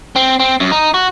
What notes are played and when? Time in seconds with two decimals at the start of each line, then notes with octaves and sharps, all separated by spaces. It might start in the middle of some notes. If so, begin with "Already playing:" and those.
0.16 C4
0.40 C4
0.60 F#2
0.72 D#4
0.94 F#4